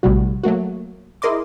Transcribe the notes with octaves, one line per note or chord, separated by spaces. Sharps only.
A#1 A2 C3 G3 F#4
F#3 A3 A#3 F#4
E4 G#4 A#4 D#5 C6 D6